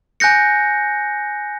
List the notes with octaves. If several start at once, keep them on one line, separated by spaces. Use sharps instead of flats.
G#5 F#6 G6 A#6 C#7